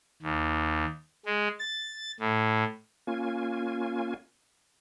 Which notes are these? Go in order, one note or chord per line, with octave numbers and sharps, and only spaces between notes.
D#2
G#3
A6
A2
A#3 C#4 F4 G#5